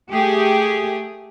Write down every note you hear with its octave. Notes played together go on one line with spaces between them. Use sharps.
A3 G4 G#4